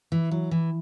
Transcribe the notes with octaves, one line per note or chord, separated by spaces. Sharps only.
E3
F#3
E3